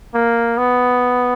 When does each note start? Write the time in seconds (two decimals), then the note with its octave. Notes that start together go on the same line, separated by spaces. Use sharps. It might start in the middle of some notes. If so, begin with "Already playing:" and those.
0.14 A#3
0.58 B3